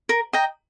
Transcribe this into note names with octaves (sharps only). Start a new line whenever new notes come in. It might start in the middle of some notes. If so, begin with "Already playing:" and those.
A#4
D#5 G5 A#5